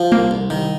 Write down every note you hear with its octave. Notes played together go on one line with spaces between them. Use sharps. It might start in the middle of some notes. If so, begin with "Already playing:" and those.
Already playing: F3
C2 A#3
C2
D#3 G3